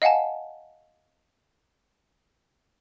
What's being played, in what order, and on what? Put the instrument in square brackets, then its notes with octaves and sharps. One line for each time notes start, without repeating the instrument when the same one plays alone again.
[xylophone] D#5 F5 F#5 G#5 A5